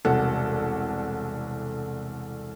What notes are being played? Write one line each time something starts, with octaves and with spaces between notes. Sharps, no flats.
E1 C2 A4 F#5